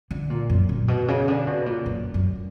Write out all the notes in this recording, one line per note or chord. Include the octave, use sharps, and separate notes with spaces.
D3
A#2
F#2
A#2
B2
C#3
D3
B2
A#2
F#2
F#2